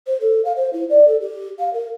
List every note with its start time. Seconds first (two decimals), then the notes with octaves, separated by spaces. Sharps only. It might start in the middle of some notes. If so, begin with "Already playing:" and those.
0.07 C5
0.21 A4
0.45 F5
0.56 C5
0.73 E4
0.90 D5
1.08 A4
1.21 G4
1.59 F5
1.73 A#4